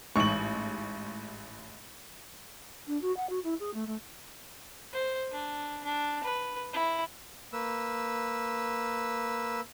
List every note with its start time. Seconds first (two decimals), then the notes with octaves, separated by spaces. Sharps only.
0.16 A1 G#2 C#6 F#7
2.87 D4
3.01 F#4
3.16 F#5
3.29 F#4
3.43 E4
3.59 G#4
3.73 A3
3.86 A3
4.92 C5
5.32 D4
5.84 D4
6.24 B4
6.73 E4
7.53 A#3 B4 E6